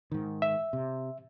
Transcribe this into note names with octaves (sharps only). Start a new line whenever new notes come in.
G#2 D#3
E5
C3